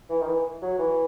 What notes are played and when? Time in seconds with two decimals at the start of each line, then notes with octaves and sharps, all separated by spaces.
0.09 E3
0.21 D#3
0.27 E3
0.62 F#3
0.79 E3